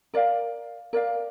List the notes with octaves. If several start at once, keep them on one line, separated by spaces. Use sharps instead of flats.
A#4 D5 F5
A#4 D5 F5